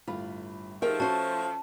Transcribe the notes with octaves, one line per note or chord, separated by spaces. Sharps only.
G1 A2 F4 B5
F3 A3 D#4 G4 G#4 A#4 G5
C#4 F#4 C5 A5